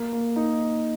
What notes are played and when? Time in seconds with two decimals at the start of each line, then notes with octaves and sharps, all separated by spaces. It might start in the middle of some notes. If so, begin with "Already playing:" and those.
Already playing: A#3
0.13 A#3
0.36 D#4